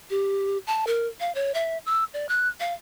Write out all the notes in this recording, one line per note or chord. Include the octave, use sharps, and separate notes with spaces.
G4
A5
A#4
F5
C#5
E5
E6
D5
F#6
F5